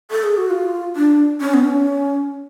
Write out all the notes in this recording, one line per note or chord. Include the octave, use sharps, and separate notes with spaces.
A4
G#4
F#4
F4
D4
C#4
B3
D4
C#4